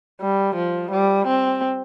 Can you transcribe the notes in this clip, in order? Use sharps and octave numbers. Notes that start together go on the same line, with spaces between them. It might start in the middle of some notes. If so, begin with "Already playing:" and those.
G3
F3
G3
C4